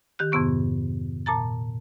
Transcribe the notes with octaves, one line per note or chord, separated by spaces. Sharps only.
D#3 G4 F#6
F2 G#2 C3 B3 C#6
A#2 A5 A#5 A6